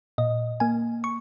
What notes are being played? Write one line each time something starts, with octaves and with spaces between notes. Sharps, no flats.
A#2 D#5
A#3 G#5
C#6